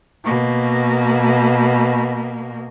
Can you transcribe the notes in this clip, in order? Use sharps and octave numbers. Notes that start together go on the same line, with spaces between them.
B2 A#3